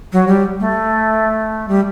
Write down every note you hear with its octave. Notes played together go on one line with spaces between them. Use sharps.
F#3
G3
A3
G3